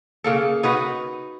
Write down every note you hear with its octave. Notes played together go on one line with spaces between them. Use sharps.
C#3 A#3 A4
D#4 F#4 B4